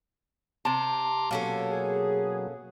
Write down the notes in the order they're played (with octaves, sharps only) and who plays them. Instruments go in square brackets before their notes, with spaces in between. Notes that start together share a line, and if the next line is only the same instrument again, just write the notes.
[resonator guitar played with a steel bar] C3 A5 [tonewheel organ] A#5 C6 D6
[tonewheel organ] B2 F#3 [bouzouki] A#3 C#4 A4
[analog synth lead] G#4